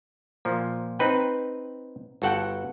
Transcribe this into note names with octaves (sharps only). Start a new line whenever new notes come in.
A#2 F3
C4 D#4 B4 G5
G1 F#4 A4 F#5 G5